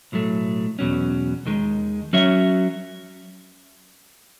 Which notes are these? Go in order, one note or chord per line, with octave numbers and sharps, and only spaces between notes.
B1 A2 F#3 A3
E2 B2 F#3 C#4
D#2 D#3 G#3
F#3 C#4 F#4 C#5 E5